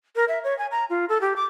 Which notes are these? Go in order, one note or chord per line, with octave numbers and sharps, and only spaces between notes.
A#4
E5
C#5
G#5
A#5
F4
A4
G4
D6